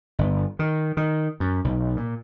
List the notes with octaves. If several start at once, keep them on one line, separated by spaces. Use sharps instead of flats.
G1
D#3
D#3
F#2
B1
A#2